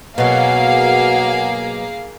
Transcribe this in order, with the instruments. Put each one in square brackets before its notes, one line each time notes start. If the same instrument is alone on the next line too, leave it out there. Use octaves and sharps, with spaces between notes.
[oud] B2 F#3 [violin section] A#3 G#4 F5 [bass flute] F#5